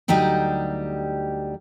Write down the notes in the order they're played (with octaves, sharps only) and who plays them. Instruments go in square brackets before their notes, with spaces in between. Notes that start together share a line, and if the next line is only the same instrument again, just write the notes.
[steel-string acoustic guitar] D2 F#3 G3 D#4 G4 D#5